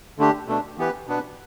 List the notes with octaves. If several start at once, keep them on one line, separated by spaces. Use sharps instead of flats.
D3 A3 D4 G4
B2 A3 D4
E3 B3 G4 B4
B2 B3 D4 B4